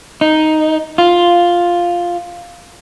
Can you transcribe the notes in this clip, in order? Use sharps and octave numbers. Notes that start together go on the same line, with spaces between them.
D#4
F4